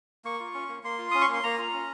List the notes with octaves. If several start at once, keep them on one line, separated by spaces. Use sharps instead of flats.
A#3 C#6
F4
C#4
A#3
A#3 C6
F4
C#4 D#6
C#6
A#3 C6
A#3 A#5
F4
C#4